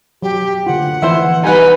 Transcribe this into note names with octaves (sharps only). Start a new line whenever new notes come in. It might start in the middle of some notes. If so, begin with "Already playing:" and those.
F#3 G4
D3 F4 F#5
E3 F3 E4 C5
G3 D#4 B4 F#5 G#5